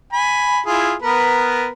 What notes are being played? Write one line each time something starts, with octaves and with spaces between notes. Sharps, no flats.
G#5 B5
E4 F4 G#4
B3 A#4 B4